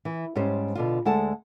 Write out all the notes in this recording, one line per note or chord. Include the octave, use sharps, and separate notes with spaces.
E3
G#2 G3 C#4 G4 C5
B2 D3 F4
D2 G#3 A4 F#5 A5